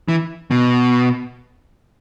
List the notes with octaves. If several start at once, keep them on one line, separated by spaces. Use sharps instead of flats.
E3
B2